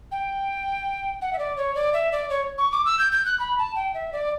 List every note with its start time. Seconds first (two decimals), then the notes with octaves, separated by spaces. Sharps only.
0.12 G5
1.22 F#5
1.33 E5
1.39 D5
1.57 C#5
1.75 D5
1.93 E5
2.12 D5
2.30 C#5
2.58 C#6
2.72 D6
2.85 E6
2.99 G6
3.12 G6
3.25 F#6
3.40 B5
3.58 A5
3.76 G5
3.94 E5
4.13 D5